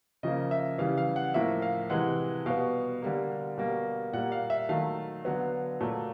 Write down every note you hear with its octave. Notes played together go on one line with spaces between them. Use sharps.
C#3 F3 A#3 D#5
E5
C#3 E3 G3 F5
F5
F#5
A2 F3 A#3 E5
F5
C3 E3 G#3 F#5
B2 G3 B3 F5
D3 G3 A#3
B2 G3 A#3
A#2 G3 A#3 F#5
F5
E5
D#3 F#3 A3 F5
D3 F#3 B3
A#2 F#3 A3